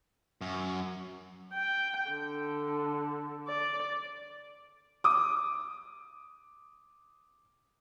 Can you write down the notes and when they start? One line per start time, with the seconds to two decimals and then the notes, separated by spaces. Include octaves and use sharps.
0.41 F#2
1.53 G5
2.11 D3
3.48 D5
5.04 D6 D#6